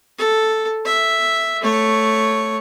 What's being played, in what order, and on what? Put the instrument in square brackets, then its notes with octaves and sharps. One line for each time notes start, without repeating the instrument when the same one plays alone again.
[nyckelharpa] A4
E5
A3 C#5